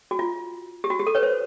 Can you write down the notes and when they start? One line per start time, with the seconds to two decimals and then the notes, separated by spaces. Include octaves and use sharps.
0.11 F#4
0.19 F4
0.84 G4
0.90 F#4
0.99 G4
1.07 A4
1.15 B4 C#5
1.23 C5